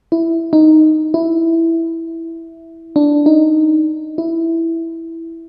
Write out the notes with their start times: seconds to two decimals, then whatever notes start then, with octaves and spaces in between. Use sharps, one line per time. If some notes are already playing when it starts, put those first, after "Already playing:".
0.12 E4
0.53 D#4
1.14 E4
2.96 D4
3.26 D#4
4.18 E4